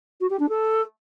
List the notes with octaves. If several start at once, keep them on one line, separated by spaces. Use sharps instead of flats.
F#4
G4
D4
A4